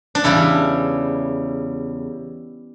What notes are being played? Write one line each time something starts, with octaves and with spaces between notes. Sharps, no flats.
D4
E2 C#3 G3 E4